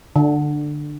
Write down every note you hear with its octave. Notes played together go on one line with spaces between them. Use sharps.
D3